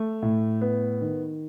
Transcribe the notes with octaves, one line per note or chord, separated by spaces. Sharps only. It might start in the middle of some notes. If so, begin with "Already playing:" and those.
Already playing: A3
A2
B3
D#3